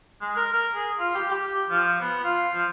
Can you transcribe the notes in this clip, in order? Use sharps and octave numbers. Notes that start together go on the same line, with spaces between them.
G#3
A#4
A#4
G#4
F4
G4
G4
F3
B3
F4
F3